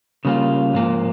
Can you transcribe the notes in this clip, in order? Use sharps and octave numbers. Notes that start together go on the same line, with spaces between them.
C#3 G3 A#3 F4
G#2 F3 A#3